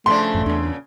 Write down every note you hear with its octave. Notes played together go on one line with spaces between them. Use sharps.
C#3 F3 A3 D4 C6
A1 F#2
E2 A#2 C#3 D4